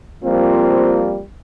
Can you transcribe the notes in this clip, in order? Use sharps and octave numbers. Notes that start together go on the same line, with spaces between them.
F3 G3 A#3 C4 F4